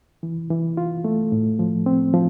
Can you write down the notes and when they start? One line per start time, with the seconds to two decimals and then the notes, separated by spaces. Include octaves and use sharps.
0.23 E3
0.50 E3
0.77 F4
1.04 A3
1.32 A2
1.59 F3
1.86 C4
2.13 F3